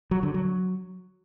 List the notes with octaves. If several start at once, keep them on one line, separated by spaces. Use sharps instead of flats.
F#3
D3
F#3